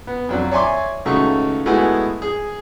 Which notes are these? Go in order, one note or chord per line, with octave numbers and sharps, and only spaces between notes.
B3
F2 F#3 D4
C#5 D5 E5 G#5 C6 D6
C#2 C#3 A3 D#4 F#4 C#6
G#3 A3 B3 E4 F#4 G#5
G#4